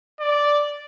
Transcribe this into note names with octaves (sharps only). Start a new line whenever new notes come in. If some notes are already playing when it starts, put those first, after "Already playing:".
D5